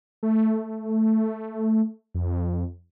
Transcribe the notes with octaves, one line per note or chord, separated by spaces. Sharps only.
A3
F2